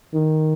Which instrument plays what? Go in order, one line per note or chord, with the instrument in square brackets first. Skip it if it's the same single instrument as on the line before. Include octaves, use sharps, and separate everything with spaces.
[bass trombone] D#3